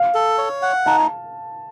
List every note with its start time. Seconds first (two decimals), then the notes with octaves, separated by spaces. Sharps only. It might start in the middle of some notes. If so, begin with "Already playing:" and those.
Already playing: F5
0.14 A4
0.38 C#5
0.62 F#5
0.86 D#4 A5